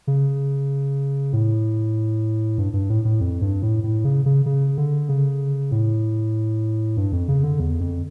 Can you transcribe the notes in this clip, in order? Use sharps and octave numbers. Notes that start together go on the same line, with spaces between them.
C#3
A2
G2
G2
A2
A2
F2
G2
A2
A2
C#3
C#3
C#3
D3
C#3
A2
G2
F2
C#3
D3
E2
F2